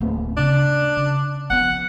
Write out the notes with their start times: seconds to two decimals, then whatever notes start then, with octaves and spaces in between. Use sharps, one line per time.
0.01 D1 A#3
0.37 C#3 D4
0.97 C#3
1.50 F3 B3 F#5